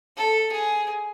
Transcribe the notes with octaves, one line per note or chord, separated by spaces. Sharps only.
A4
G#4